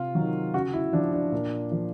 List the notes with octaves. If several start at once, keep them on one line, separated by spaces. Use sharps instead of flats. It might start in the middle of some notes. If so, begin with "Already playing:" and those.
Already playing: C3 F4
D#3 F#3
C#3 F#4
E4
F3 D4
D4
A#2
F3